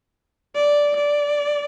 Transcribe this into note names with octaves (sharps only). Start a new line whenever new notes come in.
D5
D5